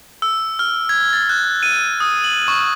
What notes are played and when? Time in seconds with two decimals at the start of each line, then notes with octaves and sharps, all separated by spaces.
0.22 E6
0.59 F6
0.89 G#6
1.13 A6
1.29 F#6
1.63 D#7
2.00 D#6
2.24 F#7
2.48 C#6